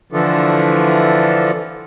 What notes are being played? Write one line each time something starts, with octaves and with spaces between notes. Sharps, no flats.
D3 E3 F3 A3